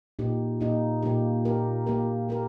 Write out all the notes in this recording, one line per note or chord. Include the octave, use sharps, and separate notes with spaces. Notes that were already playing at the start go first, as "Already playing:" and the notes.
A#2 A#3 D#4 G4
A#2 A#3 D#4 G4
A#2 A#3 D#4 G4
A#3 G4 A#4
A#3 G4 A#4
A#3 G4 A#4